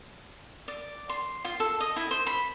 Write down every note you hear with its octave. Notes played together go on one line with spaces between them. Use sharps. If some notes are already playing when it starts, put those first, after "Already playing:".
D5
C6
F4
A4
D#5
E4
C5
B5